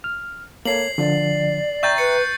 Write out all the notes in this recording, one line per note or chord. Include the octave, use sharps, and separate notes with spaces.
F6
A#3 A4 C#5 C7 F#7
D3 F3 D5
E5 G5 A#5 C#6 G6 A6
B4 C#7